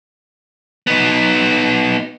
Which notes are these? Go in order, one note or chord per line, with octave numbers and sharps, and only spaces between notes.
B3 D#4